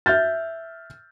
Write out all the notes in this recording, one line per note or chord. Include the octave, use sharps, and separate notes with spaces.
E5 F6 G6 A6